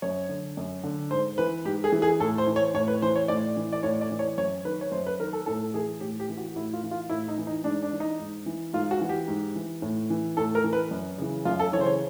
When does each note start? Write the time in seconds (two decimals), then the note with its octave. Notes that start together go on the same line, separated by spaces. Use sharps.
0.02 F#2 C#5
0.29 D3
0.57 F#2
0.84 D3
1.11 G#2 C5
1.38 E3 B4
1.65 G#2 G4
1.84 G#4
1.92 E3
2.02 G#4
2.20 A2 A4
2.38 C5
2.47 E3
2.56 C#5
2.74 A2 C#5
2.88 B4
3.02 E3 C5
3.16 C#5
3.28 A2 D5
3.57 E3
3.72 D5
3.83 A2 C#5
4.01 D5
4.11 E3
4.19 C#5
4.38 F#2 C#5
4.65 D#3 B4
4.81 C#5
4.92 F#2 C5
5.07 B4
5.20 D#3 A#4
5.33 A4
5.46 A2 A4
5.74 E3 G#4
6.01 A2 G4
6.20 G4
6.29 E3
6.38 F#4
6.56 A2 E4
6.73 F4
6.83 E3
6.91 F4
7.10 A2 E4
7.28 D#4
7.38 E3
7.47 D#4
7.64 G#2 D4
7.83 D4
7.92 E3
8.00 D#4
8.20 G#2
8.46 E3
8.73 G#2 F4
8.91 F#4
9.01 E3
9.09 G4
9.28 G#2
9.56 E3
9.82 A2
10.10 E3
10.37 A2 A4
10.55 A#4
10.64 E3
10.73 B4
10.91 F#2
11.18 C#3 E3
11.45 F#2 F4
11.59 A4
11.73 E3 C#5
11.78 C#3 C5
11.86 C#5